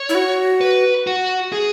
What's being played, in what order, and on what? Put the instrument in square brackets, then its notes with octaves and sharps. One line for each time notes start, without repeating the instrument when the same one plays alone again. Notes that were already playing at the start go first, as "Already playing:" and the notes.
Already playing: [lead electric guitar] C#5
[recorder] E4
F#4
[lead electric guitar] B4
F#4
G#4